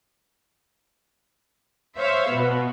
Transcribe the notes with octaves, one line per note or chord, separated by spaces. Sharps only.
C5 C#5 E5 F5
B2 B3